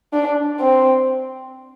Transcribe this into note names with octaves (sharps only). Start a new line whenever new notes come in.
D4
C4